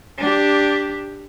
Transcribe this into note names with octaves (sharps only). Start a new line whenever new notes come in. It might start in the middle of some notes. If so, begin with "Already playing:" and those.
D4 G4